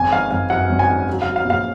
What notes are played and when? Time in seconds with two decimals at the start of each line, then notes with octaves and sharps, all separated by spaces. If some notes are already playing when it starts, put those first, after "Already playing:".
Already playing: G#1 G#5
0.12 D#3 F5
0.31 G#1 F5
0.50 F#2 F#5
0.70 G#1
0.79 G#5
0.88 D#3
1.08 F#3
1.22 F#3 F5
1.36 F5
1.45 A#1
1.50 F5